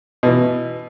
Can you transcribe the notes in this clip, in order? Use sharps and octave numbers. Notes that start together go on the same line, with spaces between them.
B2 E3